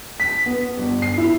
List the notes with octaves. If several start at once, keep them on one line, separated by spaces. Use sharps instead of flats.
B6
B3
G1
C7
E4